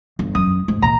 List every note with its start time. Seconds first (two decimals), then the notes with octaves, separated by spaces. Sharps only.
0.19 G1
0.35 F#2 D#6
0.68 G#2
0.82 A#2 D#3 A#5